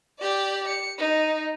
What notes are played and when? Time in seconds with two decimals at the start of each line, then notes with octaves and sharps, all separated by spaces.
0.20 G4 D5
0.68 C#7
0.98 D#4